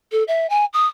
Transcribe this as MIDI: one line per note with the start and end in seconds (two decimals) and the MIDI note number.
0.12 0.23 69
0.28 0.47 76
0.50 0.65 80
0.73 0.86 87